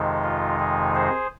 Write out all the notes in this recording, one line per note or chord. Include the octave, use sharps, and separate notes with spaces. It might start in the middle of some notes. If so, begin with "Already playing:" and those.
Already playing: F2 C3 D#3 G#3 D#4
F4
G#4
G#4 C5